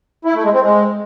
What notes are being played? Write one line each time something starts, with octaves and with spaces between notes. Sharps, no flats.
E4
A3
G#3
C4
G#3